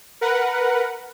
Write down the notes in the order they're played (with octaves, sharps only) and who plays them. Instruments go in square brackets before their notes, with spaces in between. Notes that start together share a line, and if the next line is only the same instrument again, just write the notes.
[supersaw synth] A#4 B4 F#5